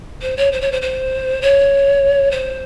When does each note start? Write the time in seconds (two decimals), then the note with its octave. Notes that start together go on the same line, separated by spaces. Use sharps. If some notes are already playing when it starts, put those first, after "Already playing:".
0.22 C5
0.37 C#5
0.52 C5
0.61 C#5
0.72 C5
0.82 C5
1.42 C#5
2.31 C5